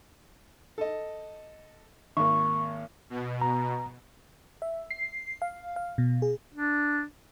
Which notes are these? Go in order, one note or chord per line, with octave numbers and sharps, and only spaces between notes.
A4 D#5
G#1 A#3 C#6
B2
A#5
E5
C7
F5
F5
B2
G#4
D4